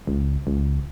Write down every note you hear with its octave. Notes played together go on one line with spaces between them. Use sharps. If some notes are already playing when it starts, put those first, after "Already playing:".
C#2
C#2